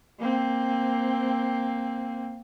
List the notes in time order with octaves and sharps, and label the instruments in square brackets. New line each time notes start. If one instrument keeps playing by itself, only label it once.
[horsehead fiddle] A#3 C4